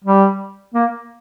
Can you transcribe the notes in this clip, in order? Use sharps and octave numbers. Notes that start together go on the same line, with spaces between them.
G3
A#3